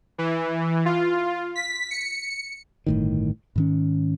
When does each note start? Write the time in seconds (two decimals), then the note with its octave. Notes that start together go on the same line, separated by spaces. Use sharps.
0.18 E3
0.86 F4
1.55 B6
1.91 C#7
2.87 G1 A2 D#3
3.56 G#2 D#3 C#4